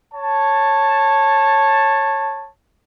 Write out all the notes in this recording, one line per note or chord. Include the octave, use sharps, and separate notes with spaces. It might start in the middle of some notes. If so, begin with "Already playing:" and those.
C#5 A5